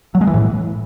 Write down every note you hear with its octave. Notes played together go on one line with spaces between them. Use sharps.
F#3
G#3
E3
A2